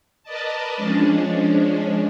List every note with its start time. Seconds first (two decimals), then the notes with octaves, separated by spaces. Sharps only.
0.24 A#4 B4 D5 D#5 A5
0.77 F3 G#3 C#4 D4